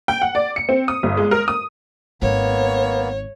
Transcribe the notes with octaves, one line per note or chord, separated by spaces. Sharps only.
G5
F#5
D5
C#7
C4
D#6
G1
G#3
A#4
D#6
G#1 A#3 B3 C#5